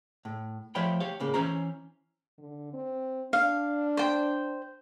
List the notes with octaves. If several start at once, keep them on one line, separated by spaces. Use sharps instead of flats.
A2
F3 A3 C#5 E5 G5 B5
G4 C#5 F5
A2 C#3 A#3
E3 C#4 C5 C#5 A#5
D3
C4
D4 F5
C5 G5